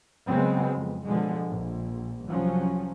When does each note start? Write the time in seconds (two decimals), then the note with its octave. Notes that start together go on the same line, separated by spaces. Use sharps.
0.29 C#3 F#3 G#3 B3 C4
0.75 F2
1.05 B2 D3 F3 G#3
1.49 A#1
2.26 C2 F3 F#3 C#4